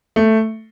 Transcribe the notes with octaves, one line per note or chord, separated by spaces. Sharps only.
A3